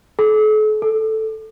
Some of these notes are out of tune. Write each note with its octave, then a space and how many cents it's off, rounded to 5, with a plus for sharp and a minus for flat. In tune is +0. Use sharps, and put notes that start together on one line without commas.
A4 -40
A4 +0